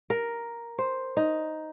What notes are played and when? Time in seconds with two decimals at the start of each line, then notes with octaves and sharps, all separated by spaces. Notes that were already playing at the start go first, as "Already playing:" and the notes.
0.10 A#4
0.78 C5
1.17 D#4